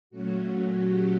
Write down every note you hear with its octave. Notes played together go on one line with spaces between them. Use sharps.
A#2 F#3 A3 C#4 F#4
G4